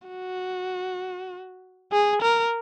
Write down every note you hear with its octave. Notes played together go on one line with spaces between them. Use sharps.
F#4
G#4
A#4